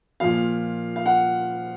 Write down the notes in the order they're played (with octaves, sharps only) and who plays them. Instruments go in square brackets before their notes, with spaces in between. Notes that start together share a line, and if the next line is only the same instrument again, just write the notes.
[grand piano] A#2 F3 F5
F5
F#5